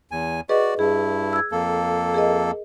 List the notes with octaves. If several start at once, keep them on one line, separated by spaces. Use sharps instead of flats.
E2 G#5
F#4 G#4 B4 D5 D#5
G2 E4 G#4
E6 G#6
F2 A#3 A4
G#4 A#4 D#5